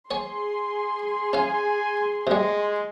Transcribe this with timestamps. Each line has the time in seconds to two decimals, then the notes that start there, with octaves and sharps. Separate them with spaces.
0.11 G#4 C#5 G#5 C6
1.33 C#4 F5 G#5
2.27 C3 G3 G#3